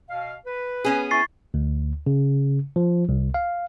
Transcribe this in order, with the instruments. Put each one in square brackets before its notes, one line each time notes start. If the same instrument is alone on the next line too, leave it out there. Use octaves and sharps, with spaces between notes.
[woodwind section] B2 F5
B4
[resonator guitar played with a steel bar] B3 C#4 G#4
[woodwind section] E4 [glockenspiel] C#6 A6 C7
[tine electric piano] D2
C#3
F3
C2
F5